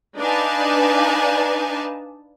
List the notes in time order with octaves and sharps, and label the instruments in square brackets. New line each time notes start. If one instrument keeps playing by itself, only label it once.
[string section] D4 D#4 B4 F5 G#5 A5